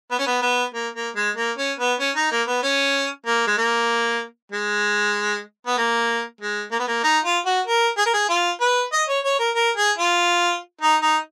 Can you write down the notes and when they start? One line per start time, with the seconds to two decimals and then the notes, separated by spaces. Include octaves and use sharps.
0.11 B3
0.19 C#4
0.27 B3
0.42 B3
0.74 A#3
0.95 A#3
1.16 G#3
1.37 A#3
1.58 C#4
1.79 B3
2.00 C#4
2.16 D#4
2.31 A#3
2.47 B3
2.63 C#4
3.26 A#3
3.47 G#3
3.57 A#3
4.52 G#3
5.67 B3
5.77 A#3
6.41 G#3
6.72 A#3
6.79 B3
6.88 A#3
7.03 D#4
7.24 F4
7.46 F#4
7.66 A#4
7.98 G#4
8.06 A#4
8.14 G#4
8.29 F4
8.61 B4
8.92 D#5
9.08 C#5
9.24 C#5
9.39 A#4
9.55 A#4
9.77 G#4
9.98 F4
10.81 D#4
11.02 D#4